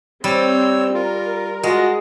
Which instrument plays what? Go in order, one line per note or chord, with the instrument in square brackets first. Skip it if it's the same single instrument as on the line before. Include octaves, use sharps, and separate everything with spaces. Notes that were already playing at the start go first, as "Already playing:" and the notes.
[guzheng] G3 [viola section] C4 [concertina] C#5 E6
[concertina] F4 [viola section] A#4
[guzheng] G#3 [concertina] F4 D#5 [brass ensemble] F#4